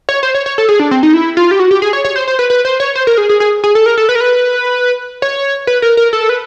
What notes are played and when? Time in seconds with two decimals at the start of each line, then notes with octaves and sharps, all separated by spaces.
0.09 C#5
0.23 C5
0.34 C#5
0.46 C#5
0.58 A4
0.69 G#4
0.80 D4
0.91 C4
1.03 D#4
1.14 E4
1.37 F4
1.51 G4
1.60 F#4
1.71 G4
1.82 G#4
1.93 C#5
2.04 C#5
2.16 C5
2.28 C5
2.39 B4
2.50 B4
2.65 C5
2.80 C#5
2.95 C5
3.07 A#4
3.18 G#4
3.29 G#4
3.40 G#4
3.64 G#4
3.75 A4
3.86 A#4
3.97 A4
4.09 B4
4.15 A#4
4.21 B4
5.22 C#5
5.67 B4
5.82 A#4
5.97 A#4
6.13 A4
6.29 B4